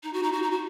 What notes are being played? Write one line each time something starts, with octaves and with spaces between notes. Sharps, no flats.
D#4
F#4
D#4
F#4
D#4
F#4